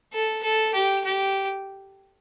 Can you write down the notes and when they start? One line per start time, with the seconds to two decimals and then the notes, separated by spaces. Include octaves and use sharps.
0.13 A4
0.43 A4
0.74 G4
1.05 G4